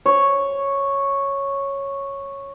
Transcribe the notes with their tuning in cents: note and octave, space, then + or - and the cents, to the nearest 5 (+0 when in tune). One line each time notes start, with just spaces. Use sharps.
C#5 -5